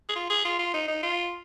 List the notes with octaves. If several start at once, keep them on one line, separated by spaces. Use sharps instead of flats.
G#4
F4
G#4
F4
F4
D#4
D#4
F4